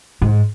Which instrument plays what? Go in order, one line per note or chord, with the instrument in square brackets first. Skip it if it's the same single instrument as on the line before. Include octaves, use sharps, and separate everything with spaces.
[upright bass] G#2